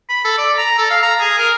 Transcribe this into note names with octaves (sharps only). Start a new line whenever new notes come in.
B5
A4
D5
A#5
A4
F5
A#5
G#4
A#4